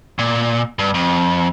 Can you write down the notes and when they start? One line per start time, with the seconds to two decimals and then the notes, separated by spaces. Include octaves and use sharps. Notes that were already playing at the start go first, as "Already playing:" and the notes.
0.19 A#2
0.79 G2
0.94 F2